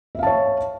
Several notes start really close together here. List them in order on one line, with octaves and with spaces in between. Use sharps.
E5 F5 A5 C#5